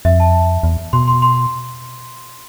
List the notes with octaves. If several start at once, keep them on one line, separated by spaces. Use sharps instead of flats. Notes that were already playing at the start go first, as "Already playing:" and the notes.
F2 E5
A5
E2
B2 C6
C6
C6